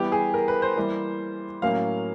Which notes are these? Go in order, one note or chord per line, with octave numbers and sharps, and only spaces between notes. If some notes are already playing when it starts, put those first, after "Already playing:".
Already playing: E3 G3 B3 G4
G#4
A#4
B4
C5
E3 G3 A#3
A2 F#3 A#3 C#4 F5